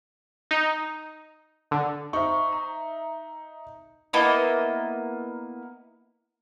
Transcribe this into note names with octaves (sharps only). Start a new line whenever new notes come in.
D#4
D3
D#4 C5 E5 C#6
A#5
A#3 B3 E4 D#5